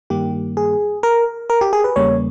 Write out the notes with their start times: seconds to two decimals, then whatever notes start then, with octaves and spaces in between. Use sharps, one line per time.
0.10 G2 D#3 G3 A#3 G4
0.57 G#4
1.03 A#4
1.50 A#4
1.61 G4
1.73 G#4
1.84 B4
1.96 E2 C#3 G3 A#3 C#5